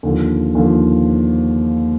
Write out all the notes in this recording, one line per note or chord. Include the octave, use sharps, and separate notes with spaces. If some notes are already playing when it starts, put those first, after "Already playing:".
D#2 D3 F3
D#2 D3 F3